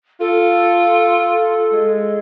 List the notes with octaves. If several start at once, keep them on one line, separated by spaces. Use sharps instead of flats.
F4 A4
G#3